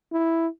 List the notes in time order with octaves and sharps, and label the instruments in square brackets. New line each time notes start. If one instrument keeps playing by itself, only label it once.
[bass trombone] E4